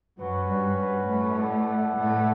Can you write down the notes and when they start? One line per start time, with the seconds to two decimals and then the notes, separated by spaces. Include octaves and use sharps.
0.19 F#2 F#3 C#4 F#4 B4
0.49 G2 G3
0.78 G2 G3
1.08 A2 A3
1.37 E4 B4 D5 F#5
1.97 A2 A3